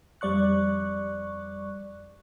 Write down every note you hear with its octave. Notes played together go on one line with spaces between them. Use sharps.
F2 G3 D5 C#6 F#6